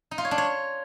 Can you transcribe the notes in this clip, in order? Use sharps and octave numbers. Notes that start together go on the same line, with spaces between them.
D#4
F4
C#5
D4
C#5